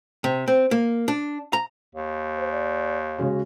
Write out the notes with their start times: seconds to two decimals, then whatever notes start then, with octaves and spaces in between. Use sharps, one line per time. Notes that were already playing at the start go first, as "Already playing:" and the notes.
0.24 C3
0.48 C4
0.71 A#3
1.08 D4
1.53 A#5
1.95 D#2
2.38 C5
2.51 D5
3.18 C#3 G#3 C#4 F#4